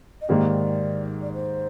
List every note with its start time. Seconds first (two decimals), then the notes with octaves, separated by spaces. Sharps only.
0.21 D#5
0.29 G#2 D#3 A#3 D#4 G4 D5
1.22 D5
1.33 C5